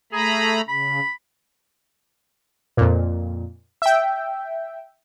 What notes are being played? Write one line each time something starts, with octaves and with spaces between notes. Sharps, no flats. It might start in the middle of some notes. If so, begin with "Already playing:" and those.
A3 G#4 A#5 B5
C#3 B5
F2 A#2
E5 G5